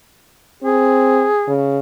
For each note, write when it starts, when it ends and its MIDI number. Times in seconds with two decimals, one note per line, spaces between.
0.63 1.28 60
0.63 1.51 68
1.48 1.80 49